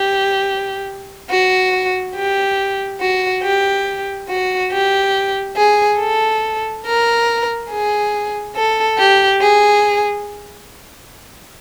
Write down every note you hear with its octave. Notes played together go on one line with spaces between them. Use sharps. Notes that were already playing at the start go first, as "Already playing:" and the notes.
Already playing: G4
F#4
G4
F#4
G4
F#4
G4
G#4
A4
A#4
G#4
A4
G4
G#4